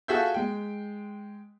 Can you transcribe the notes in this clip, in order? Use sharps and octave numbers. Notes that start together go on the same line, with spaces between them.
F4 F#4 G#4 A4 E5 G6
G#3 G5